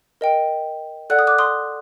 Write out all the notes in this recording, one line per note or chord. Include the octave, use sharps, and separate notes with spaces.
A#4 D#5 G5
A4 D5 F#5 F#6
D#6
D6 F#6
C6 D#6